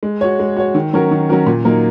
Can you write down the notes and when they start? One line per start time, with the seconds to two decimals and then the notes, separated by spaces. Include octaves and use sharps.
0.03 G#3
0.21 F#4 C#5
0.39 G#3
0.57 F#4 C#5
0.75 D#3
0.93 F#3 C#4 F#4 A#4
1.11 D#3
1.29 F#3 C#4 F#4 A#4
1.46 A#2
1.65 F#3 A#3 D#4 A#4